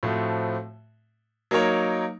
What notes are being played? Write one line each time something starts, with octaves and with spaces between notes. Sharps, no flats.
A2 F3 A3 C4 F#4
F#3 A#3 D#4 A#4 C#5